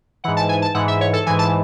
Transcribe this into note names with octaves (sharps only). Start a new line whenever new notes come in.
G#2 E3 F#5
A5
G#5
A5
G#2 E3 F#5
E5
C#5
A4
G#2 E3 G#5
A5